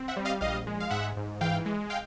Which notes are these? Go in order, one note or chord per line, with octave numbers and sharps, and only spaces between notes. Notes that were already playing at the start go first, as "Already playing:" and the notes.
Already playing: C4
E5 F#5
G3
D#5 F5
A#1 D#5 F5
G#3
F5
G#2 E5 F#5
G#2
E3 F5 G5
G#3
F5 G5